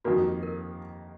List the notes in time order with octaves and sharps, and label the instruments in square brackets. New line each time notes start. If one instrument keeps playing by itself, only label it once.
[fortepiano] F2 D#3 A#3 [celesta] F#4
[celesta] A#4